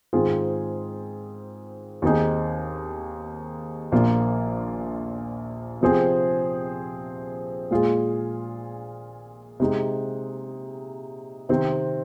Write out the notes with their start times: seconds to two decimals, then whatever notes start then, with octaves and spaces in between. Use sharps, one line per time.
0.13 G#2 D#3 C4 F4 G#4
2.02 D#2 D#3 C4 D#4 G#4
3.92 A#1 A#2 F3 A#3 F4
5.81 C3 F3 C4 G#4
7.71 A#2 G#3 F4 G#4
9.60 C3 G#3 D#4
11.49 C3 D#3 C4